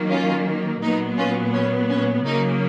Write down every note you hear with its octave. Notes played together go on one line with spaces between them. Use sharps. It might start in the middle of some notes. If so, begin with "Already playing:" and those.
Already playing: D#3 F#3 A#3
C#4 F4
A#2 F#3 B3 D#4
C#4 F4
C#4
C#4
C#3 F#3 A#3 D#4